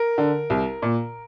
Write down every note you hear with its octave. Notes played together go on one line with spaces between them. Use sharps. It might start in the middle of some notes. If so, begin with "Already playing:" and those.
Already playing: A#4
D3
C2
A#2